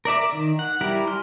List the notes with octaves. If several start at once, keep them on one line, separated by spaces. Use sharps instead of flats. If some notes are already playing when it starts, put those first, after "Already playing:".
A#4 D5 E5 D6
D#3
F#5
G3 E4 G4 A#4
G#5 C6 F6